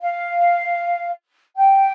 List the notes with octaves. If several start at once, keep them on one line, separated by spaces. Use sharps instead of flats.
F5
G5